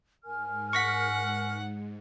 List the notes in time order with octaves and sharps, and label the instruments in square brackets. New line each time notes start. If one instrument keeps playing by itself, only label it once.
[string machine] G#2 [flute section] A#4 G#5 F6
[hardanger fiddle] F#5 [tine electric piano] C#6 A#6 B6